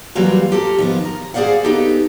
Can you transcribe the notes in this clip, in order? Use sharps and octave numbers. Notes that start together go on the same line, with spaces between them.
E3 F#3 G3 A#3 F4 F#4
F4 G4 A4 A#4
D#3 F3 B3
A#4
G#4 C5 D5 F5 F#5
B3 D#4 G4 A4